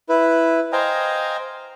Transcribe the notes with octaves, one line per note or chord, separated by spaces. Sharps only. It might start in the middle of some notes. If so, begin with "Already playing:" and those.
E4 B4
C5 D#5 F5 G5 G#5 A#5